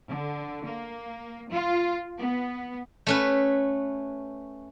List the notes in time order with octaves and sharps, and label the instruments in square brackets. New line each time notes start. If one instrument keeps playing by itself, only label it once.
[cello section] D3
A#3
F4
B3
[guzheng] A3 C#4 B4